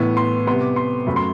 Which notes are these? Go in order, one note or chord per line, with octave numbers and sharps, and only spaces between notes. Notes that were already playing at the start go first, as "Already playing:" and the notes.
Already playing: A2 E3 B3
C6
C3 G3 B3 C6
D6
C6
F#2 F#3 A3 B5
C6